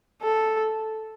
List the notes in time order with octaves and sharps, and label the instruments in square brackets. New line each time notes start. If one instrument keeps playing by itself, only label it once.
[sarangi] A4